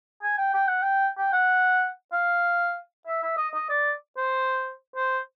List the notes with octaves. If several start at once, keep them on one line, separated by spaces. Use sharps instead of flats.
G#5
G5
G5
F#5
G5
G5
F#5
F5
E5
E5
D#5
D#5
D5
C5
C5